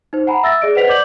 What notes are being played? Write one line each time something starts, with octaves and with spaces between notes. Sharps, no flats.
D#4 C5
F#5 G#5 A#5 B5
E5 E6 A6 A#6
G#4 D5 D#5 D7
B4 C5 F#5 B6 F7
D5 D#5 D6 G6 F#7